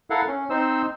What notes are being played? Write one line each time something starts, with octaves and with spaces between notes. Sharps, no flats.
E4 A4 A#4 F5 F#5
C#4
C4 D#4 C5 E6